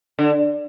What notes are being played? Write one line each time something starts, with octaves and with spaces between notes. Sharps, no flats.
D3